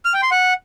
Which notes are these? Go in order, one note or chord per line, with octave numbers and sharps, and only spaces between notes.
F6
G5
C6
F#5